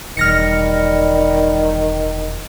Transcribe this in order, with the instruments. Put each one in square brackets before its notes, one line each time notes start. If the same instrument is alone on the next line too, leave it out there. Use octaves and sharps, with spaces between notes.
[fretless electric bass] E1 [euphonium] D#3 [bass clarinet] G3 [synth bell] F6 A#6 C#7